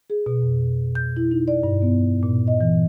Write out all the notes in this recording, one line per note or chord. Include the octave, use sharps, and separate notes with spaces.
G#4
B2
F2
G6
E4
D#4
D5
G2
B3
A#2
D#5
E3